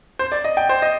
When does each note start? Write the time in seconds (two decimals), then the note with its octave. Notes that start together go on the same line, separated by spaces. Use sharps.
0.19 C5
0.32 D5
0.44 D#5
0.57 G5
0.69 C5
0.82 D#5